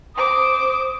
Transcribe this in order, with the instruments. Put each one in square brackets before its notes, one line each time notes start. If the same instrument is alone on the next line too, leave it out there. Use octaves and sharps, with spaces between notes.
[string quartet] C5 D6 [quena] D#6